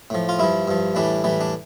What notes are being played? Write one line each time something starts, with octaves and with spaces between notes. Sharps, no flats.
A2 F3
F4
G2 F3 E4
G2 F3
A2 E3 G3 D4
A2 E3 G3
D4